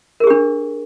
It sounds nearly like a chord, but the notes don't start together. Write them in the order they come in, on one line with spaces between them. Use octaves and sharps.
A#4 G#4 G4 D4